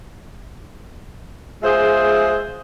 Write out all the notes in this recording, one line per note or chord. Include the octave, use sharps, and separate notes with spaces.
G#3 F4 G#4 C5 E5